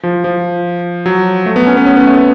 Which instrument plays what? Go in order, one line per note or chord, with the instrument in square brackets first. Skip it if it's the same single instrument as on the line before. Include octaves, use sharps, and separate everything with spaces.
[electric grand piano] F3
F3
F#3
A3
B3
C#4
B3
C#4
B3
A3
B3